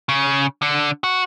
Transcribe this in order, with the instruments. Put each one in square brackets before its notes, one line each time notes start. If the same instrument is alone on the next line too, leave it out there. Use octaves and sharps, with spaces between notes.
[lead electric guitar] C#3
D3
F#4